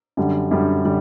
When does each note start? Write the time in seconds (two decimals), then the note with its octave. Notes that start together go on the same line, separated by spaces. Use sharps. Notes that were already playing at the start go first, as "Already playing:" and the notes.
0.17 F#2 D3 G3
0.51 F#2 D3 G3 G4
0.85 D3 G3